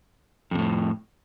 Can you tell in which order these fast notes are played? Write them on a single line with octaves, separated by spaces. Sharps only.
F2 C3 A2